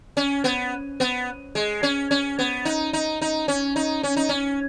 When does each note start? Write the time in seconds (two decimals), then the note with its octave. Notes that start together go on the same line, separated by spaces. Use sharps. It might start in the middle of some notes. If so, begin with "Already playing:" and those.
0.17 C#4
0.44 B3
1.00 B3
1.55 G#3
1.83 C#4
2.11 C#4
2.39 B3
2.65 D#4
2.93 D#4
3.21 D#4
3.48 C#4
3.76 D#4
4.03 C#4
4.16 D#4
4.29 C#4